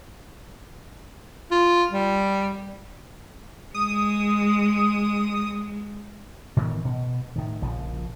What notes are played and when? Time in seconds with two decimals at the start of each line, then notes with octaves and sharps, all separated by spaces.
1.52 F4
1.91 G3
3.74 G#3 D#6
6.57 A2 D#3 E3 B3
6.85 B2
7.36 A2 D#3
7.62 A#1 C#3 F3